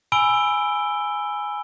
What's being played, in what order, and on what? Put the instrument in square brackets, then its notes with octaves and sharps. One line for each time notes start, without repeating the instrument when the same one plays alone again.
[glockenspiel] G#5 B5 E6 D7 G7